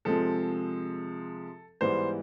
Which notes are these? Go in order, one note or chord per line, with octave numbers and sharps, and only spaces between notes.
C3 F3 G#3 C4 A4
G#2 E3 G3 B3 C5